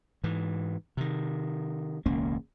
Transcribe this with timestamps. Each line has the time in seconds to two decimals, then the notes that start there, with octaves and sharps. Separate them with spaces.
0.24 G#2 E3
0.97 C3 D#3
2.06 E1 C#2 A#3 C#4